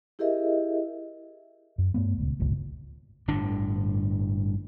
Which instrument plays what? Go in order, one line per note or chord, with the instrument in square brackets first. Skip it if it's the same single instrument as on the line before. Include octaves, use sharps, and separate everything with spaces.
[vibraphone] E4 G4 G#4 A#4 D#5 E5
[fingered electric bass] F#2
G2 A3 B3
D#1 C#2
D1 G1 C#2 A#2
[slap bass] G1 A2 D3 D4